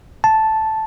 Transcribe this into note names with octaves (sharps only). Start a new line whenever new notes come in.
A5